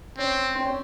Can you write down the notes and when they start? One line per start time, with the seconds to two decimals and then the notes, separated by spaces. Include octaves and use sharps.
0.18 C4 C#4
0.55 C4
0.65 C#4